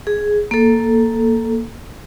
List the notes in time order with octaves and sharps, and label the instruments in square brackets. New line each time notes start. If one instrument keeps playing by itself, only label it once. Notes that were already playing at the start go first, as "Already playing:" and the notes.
[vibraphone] G#4
A#3 A4